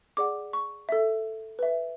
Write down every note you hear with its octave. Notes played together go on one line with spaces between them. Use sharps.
G#4 D5 F#5 D6
C#6
A4 E5
B4 E5